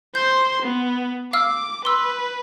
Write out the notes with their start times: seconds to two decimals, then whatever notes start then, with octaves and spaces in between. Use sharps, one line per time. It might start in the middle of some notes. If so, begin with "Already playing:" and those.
0.15 C5 C6 G6
0.62 B3
1.33 F5 D6 E6 F6
1.85 B4 C6 E6